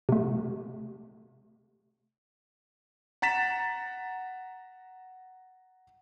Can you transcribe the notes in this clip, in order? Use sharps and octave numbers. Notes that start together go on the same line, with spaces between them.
C3 A3
F#5 A#5 A6 B6 E7